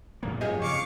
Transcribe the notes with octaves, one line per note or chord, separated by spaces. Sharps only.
F#2 A#2 F3 A#3
G#2 F4 G4 G#4 C#5 D#5
F2 C#3 F5 C#6 D6